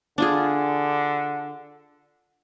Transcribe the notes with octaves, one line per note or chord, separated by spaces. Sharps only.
D3 D4 F4 G#4